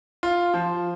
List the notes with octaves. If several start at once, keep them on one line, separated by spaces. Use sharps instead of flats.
F4
F3